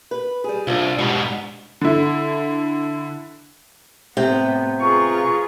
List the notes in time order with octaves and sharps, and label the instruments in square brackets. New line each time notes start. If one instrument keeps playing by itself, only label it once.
[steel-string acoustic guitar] B4
G3 G#4
[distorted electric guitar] C2 [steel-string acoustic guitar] D4 F4
[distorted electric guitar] G#2 B2 [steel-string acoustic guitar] G3
[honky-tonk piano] D3 E4
[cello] A2 B3 [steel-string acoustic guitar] C3 G5
[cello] F4 G#4 [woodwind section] B4 A#5 C#6